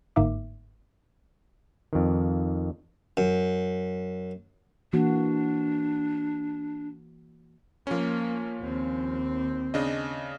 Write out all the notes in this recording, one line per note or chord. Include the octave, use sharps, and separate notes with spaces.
G1 G#2 A#3 D#4 E5 D6
F2 D#3
F#2
E3 A#3 D4 F#4
F3 A#3 C#4
D#2 C4
C#3 D4 D#5